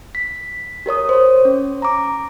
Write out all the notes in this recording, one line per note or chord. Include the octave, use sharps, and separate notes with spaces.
B6
G4 A#4 C#5 D#6
C5 C#5
C#4
A#5 D6